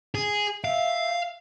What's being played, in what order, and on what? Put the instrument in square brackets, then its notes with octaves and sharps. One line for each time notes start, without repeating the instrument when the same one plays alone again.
[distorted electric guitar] G#4
[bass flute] E5 [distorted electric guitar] F5